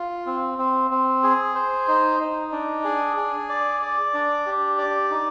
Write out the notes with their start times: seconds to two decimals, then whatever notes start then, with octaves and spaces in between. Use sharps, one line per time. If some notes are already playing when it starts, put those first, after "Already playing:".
Already playing: F4
0.26 C4
0.58 C4
0.91 C4
1.23 G#4
1.55 C5
1.88 D#4
2.20 D#4
2.52 D4
2.84 G#4
3.17 G#4
3.49 D5
3.82 D5
4.14 D4
4.46 G4
4.78 D5
5.11 D#4